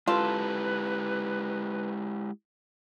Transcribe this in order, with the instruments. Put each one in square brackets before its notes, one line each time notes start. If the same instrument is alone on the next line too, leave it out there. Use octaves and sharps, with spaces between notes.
[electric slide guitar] G#3 E4 G4 [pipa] F4 A4 [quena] B4